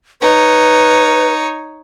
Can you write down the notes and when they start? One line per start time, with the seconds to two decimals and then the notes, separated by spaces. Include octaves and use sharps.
0.22 D#4 B4 C#5